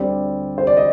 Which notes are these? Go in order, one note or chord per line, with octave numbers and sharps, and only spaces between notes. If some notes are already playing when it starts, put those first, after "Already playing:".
Already playing: D2 D3 G3 C4 D5
C5
D5
D#5